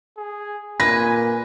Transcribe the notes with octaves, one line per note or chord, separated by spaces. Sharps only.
G#4
A#2 B4 G#5 A#6